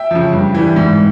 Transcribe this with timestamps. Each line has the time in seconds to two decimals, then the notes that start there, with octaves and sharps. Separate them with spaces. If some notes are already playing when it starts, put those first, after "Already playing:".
Already playing: E5 G5
0.11 C#3 F3
0.33 G2
0.55 E3 G3
0.76 G#2